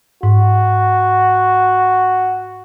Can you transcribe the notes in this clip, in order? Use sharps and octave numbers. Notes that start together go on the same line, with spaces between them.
G#2 F#4